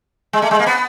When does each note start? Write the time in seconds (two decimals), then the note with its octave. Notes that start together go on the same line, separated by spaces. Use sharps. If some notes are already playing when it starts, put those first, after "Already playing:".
0.33 G#3
0.42 A3
0.51 G#3
0.59 A#3
0.66 B3